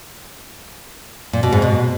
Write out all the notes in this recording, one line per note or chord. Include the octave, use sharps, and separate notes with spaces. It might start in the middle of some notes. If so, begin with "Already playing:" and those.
A#2
B2
G#2
B2